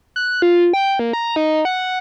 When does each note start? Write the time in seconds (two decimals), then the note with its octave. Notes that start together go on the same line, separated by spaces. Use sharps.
0.16 F#6
0.42 F4
0.73 G5
0.99 A#3
1.13 A#5
1.36 D#4
1.65 F#5